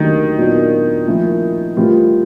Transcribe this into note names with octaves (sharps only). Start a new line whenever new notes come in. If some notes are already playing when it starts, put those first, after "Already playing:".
Already playing: D#2 D3 D#3 F#3 A3
A#2 F#3 B3 D4 F4
A2 F3 A#3 C#4 E4
A2 E3 G3 C4 F4